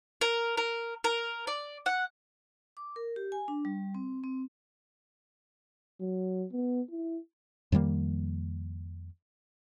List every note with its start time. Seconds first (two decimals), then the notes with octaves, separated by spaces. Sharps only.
0.21 A#4
0.57 A#4
1.04 A#4
1.47 D5
1.86 F#5
2.77 D6
2.96 A#4
3.16 G4
3.32 G#5
3.48 D4
3.65 G3
3.95 C4
4.24 C4
6.01 F#3
6.52 B3
6.91 E4
7.72 F2 D#3 G3 A#3